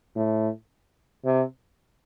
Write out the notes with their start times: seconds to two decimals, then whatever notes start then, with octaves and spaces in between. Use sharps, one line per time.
0.16 A2
1.25 C3